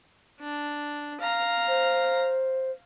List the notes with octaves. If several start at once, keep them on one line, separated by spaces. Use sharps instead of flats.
D4
F5 A#5
C5